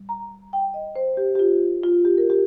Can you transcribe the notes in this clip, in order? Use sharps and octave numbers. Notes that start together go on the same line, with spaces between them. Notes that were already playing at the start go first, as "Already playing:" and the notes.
Already playing: A#2 G3
A#5
G5
D#5
C5
G4
G4
F4
F4
G4
A#4
G4